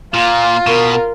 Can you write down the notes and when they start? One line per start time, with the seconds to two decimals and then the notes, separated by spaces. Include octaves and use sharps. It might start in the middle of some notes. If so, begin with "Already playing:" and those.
0.14 A#2 F4
0.67 B2 A#4